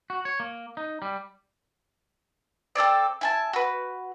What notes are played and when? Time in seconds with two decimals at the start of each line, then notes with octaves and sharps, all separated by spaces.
0.10 F#4
0.25 C#5
0.40 A#3
0.77 D#4
1.02 G3
2.75 C4 A4 C#5 D5
3.21 E4 G#5 A5
3.53 F#4 B4